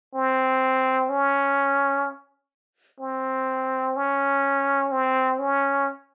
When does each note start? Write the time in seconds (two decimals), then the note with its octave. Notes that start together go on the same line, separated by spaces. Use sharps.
0.15 C4
1.10 C#4
3.00 C4
3.96 C#4
4.92 C4
5.39 C#4